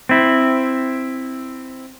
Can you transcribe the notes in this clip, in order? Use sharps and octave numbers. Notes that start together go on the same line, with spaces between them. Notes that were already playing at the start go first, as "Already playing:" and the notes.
C4 E4